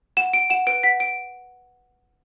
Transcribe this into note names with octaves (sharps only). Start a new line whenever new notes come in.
F#5 E7
F#5 D7
F#5 E7
B4 D7
F#5 B6
F#5 D7